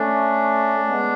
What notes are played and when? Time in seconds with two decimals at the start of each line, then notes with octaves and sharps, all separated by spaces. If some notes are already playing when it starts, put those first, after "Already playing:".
Already playing: A3 C#4 D4
0.80 A3
0.88 G#3 B3